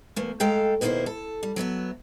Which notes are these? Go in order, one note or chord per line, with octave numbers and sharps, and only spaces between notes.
E2 A3 A#3
G#3 A4 F5 G5 A#5
D#2 B2 A#3 C#4 E4 C5
A4
G3
F#3 B3 D#5 E5